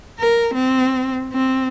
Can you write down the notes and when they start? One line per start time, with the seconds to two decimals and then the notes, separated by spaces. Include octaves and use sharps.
0.19 A#4
0.54 C4
1.32 C4